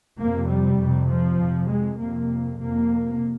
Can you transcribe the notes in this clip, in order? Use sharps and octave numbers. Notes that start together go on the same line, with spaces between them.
F2 C3 A#3
G3
F2 C3
F3
F2 C3
G#3
F2 C3 A#3
F2 C3 A#3